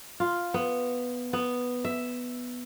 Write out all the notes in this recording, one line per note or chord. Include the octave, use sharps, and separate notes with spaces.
F4
B3
B3
E5